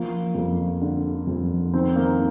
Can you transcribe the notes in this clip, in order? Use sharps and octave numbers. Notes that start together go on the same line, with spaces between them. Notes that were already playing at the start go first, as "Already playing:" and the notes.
Already playing: F3 A#3
F2
D3
F2
D#3 C4
A#3